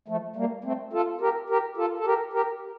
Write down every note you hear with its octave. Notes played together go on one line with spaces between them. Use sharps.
F3 A3
G3 A#3
A3 C4
F4 A4
G4 A#4
G4 A#4
F4 A4
A4
G4 A#4
G4 A#4